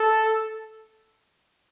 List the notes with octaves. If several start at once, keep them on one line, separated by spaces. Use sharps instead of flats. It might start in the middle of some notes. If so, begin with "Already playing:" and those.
Already playing: A4